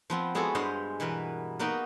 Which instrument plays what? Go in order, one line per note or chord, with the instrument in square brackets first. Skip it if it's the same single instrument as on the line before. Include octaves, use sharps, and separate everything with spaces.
[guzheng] F3 B3 C4
G#3 B3 E4 F#4 G#4 A4
G2 G#3 C5 D#5 F5 B5
B2 E3 B3 A#4 B4
A#3 B3 D#4 F#4 A#4 B4